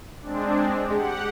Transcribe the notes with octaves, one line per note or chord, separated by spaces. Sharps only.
G#3 C4 D4
G#3 G4 F#5